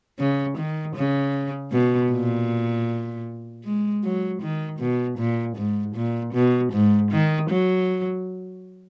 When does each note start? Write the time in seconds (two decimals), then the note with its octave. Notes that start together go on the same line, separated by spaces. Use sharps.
0.19 C#3
0.58 D#3
0.96 C#3
1.72 B2
2.12 A#2
3.64 G#3
4.04 F#3
4.42 D#3
4.80 B2
5.18 A#2
5.57 G#2
5.95 A#2
6.34 B2
6.73 G#2
7.11 D#3
7.50 F#3